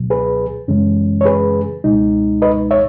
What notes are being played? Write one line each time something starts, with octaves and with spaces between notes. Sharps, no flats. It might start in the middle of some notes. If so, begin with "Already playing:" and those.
Already playing: C#2 B2 F#3
G#4 B4
F#2 C#3 E3 G#3 C#4
C#5
G#4 B4
C#2 B2 G#3 D#4
B4 D#5
C#5 E5